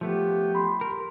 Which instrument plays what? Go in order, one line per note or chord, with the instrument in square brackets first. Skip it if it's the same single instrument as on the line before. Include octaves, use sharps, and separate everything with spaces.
[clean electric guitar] F3 A3 B3 [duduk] G4
[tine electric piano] B5 C6
[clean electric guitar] A#4